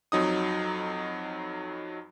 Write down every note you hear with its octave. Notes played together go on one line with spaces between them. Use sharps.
F2 F#3 D#4 D#6